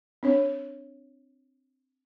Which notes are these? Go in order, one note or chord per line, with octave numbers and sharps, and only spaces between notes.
C4 D4 C#5